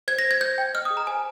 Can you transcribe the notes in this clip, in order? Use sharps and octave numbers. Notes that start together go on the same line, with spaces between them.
C5 G#6
A#6
C5
G#6
C5 G6
G5
D#5 F6
G#4 D#6
A#5
C5 G#5